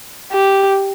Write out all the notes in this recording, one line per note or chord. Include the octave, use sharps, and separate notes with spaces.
G4